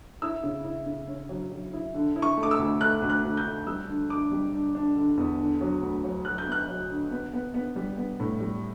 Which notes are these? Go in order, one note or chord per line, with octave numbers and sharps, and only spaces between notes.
E4 E6
C#3
E4
C#3
C#4
F#3
F#3
E4
D3
E4
C#6
A3
D6
E6
D2
A3 F#6
D2
F#6
D2
G6
A3
G3 E6
D3
D4 D6
G3
D4
D4
D3
E2
D3
F#3
D2
F#3
F#3 F#6
G6
B3 F#6
F#3
D3
B3
B3
B3
G3
B3
A2
G3